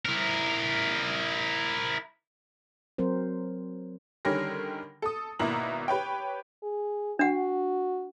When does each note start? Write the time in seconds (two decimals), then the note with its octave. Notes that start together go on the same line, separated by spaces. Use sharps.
0.05 E4 A#4
2.98 F#3 C4 A#4 C5
4.25 D3 D#3 G3 C#4 A#4 A#6
5.02 A4 D#6
5.39 G#1 B2 A#3 E4 A#5 F#7
5.88 G4 B4 C#5 G5
6.63 G#4
7.19 D4 F#4 F#5